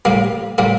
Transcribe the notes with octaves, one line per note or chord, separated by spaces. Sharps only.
A2 G3 A#3
A2 G3 A#3